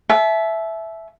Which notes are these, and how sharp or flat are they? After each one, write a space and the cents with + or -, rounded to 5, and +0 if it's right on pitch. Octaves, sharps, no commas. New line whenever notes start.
E5 +0 A5 -40